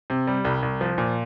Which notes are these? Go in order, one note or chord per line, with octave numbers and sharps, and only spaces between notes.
C3
G3
C2
C2
F3
A#2